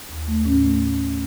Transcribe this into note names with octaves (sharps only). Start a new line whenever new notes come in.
D#2
A3
A2 C#4
A3